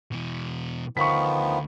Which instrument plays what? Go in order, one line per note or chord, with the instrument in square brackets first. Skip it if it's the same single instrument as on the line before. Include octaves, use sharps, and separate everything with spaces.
[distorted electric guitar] B2 E3
[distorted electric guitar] D2 [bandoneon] D#3 F3 B3 [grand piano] C#6 B6